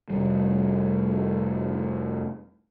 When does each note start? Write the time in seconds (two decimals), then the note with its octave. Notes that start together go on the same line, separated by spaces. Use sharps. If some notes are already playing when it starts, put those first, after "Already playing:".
0.10 F1 G3